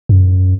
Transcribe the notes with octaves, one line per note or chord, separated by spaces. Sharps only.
F#2